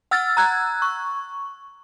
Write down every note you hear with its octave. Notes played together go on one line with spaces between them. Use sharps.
F#5 E6 F6 A6
A#5 E6 F#6 G#6
C#6